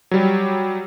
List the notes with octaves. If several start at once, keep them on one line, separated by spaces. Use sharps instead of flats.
F#3 G3 G4